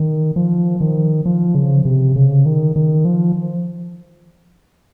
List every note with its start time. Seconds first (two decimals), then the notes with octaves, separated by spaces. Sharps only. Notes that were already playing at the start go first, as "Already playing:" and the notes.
Already playing: D#3
0.36 F3
0.80 D#3
1.26 F3
1.55 C#3
1.85 C3
2.16 C#3
2.46 D#3
2.76 D#3
3.05 F3